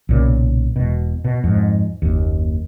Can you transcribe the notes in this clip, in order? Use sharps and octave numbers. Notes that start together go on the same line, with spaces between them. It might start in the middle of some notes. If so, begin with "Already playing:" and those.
B1 A#2 C#3
E1 B2
B2
F2 G#2
F#1 D#2